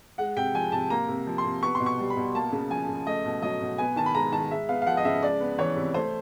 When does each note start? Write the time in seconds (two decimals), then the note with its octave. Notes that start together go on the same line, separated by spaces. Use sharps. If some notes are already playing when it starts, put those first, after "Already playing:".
0.18 G#3 F#5
0.37 C3 G5
0.55 F3 G#5
0.72 C3 A5
0.90 A#3 A#5
1.08 C3
1.27 F3
1.38 C6
1.45 C3
1.63 B3 C#6
1.75 C6
1.80 B2
1.86 C#6
1.99 G3
2.10 B5
2.17 B2
2.34 A#3 A5
2.52 C#3
2.70 F3 G#5
2.88 C#3
3.06 A3 D#5
3.25 B2
3.42 F#3 D#5
3.61 B2
3.78 B3 G#5
3.96 D#3 A5
4.06 B5
4.14 G#3 A#5
4.32 D#3 A5
4.51 G#3 E5
4.69 B3 F5
4.82 F5
4.87 F3 F#5
4.97 D#5
5.05 C#3 E5
5.23 G#3 D5
5.40 B3
5.58 E3 C#5
5.77 C3
5.94 A3 C5